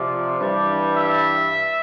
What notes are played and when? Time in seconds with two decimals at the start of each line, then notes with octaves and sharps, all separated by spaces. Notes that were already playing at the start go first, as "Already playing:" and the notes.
Already playing: C3 F3 D5
0.39 G2 E3 G3
0.95 E5